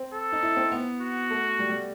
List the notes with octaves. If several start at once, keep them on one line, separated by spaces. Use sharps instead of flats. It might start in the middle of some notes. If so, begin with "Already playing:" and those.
Already playing: C4
A4
D#4
E4
C4
B3
F#4
A3
G3
G3